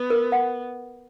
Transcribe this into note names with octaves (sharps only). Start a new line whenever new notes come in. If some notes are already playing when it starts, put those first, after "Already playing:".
Already playing: B3
A#4
F#5